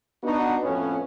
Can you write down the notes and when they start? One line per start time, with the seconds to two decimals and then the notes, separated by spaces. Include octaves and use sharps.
0.23 B3 D4 D#4 F#4
0.63 F2 A2 B3 C#4